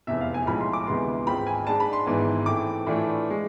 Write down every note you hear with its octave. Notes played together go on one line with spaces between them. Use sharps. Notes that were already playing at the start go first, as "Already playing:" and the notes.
F1 E2 C3 E5
F5
G#5
B1 A2 F3 G#3 B5
C6
D6
D2 C3 E3 G#3 B3 C6
G#1 G#2 G#3 C4 F4 B5
G#5
G#2 G#3 D4 A5
B5
C6
G#1 G#2 E3 B3
A2 E3 A3 C4 D6
A2 E3 A3 D4 F4
G#3